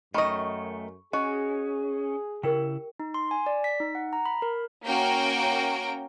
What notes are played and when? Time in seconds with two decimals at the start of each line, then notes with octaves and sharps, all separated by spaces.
0.14 F#2 D#3 A3 D#5 B5 C#6
1.13 C#4 F#4 G#4 D#5
2.43 C#3 E4 G4 A#4 G5
3.00 D#4
3.14 C6
3.31 G#5
3.46 D5
3.64 B6
3.80 D#4
3.95 F#5
4.13 A#5
4.26 B5
4.42 A#4
4.86 A#3 C#4 F#4 A#4 G5 D7